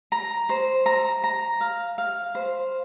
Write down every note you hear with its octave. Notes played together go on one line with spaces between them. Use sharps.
A#5
C5
A#5
A#5
F5
F5
C5